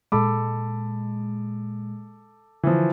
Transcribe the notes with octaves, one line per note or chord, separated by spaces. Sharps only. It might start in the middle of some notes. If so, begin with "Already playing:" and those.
A#2 G#3 A4 B5 D6
D3 E3 F3